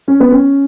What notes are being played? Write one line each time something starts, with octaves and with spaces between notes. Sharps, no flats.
C#4
B3
C#4